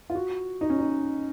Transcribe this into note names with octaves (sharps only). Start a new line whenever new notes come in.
F4
F#4
D#4
C#4
D#4